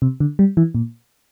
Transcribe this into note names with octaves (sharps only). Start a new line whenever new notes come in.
C3
D3
G3
E3
A#2